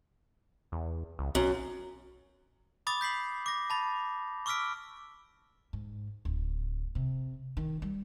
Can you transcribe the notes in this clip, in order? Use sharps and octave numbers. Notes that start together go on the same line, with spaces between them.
E2
C#2
B1 F#2
B5 D6 D#6 A6
G6 B6 C7 F#7
D6 A#6
A5 B5 A6
C#6 D6 E6 F6 B6 D7
G#2
D1
C3
D#3
G3